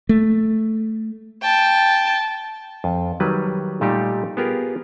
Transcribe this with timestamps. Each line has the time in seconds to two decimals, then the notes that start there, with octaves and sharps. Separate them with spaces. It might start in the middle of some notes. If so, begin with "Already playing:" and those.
0.09 A3
1.43 G5 A5
2.84 F2
3.20 D#3 F#3 G3 B4
3.81 A#2 G3 A3 D#4 G4
4.37 B3 F4 G4 G#4 A#4